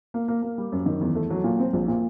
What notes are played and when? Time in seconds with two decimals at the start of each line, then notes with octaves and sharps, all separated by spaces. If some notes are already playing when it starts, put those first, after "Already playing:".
0.14 A#3
0.28 A#3
0.42 A#3
0.58 G3
0.72 F#2
0.86 D#3
1.01 E2
1.15 A3
1.30 F#3
1.44 A#2
1.59 C4
1.73 A#1
1.88 A#2